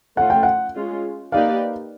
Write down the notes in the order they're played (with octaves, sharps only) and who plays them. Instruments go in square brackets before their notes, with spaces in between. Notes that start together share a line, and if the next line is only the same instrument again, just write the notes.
[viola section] A3 C#4 F4 [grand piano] F#5
[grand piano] G5
F#5
[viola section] G#3 C#4 F4
[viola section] A#3 D#4 G4 B4 D5 [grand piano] F5